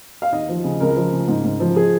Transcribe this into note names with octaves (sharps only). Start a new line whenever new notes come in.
F5
D#2 D#5
F3
C#3
C#2 A#4
F3
C#3
G#2
G#2
F3
G#4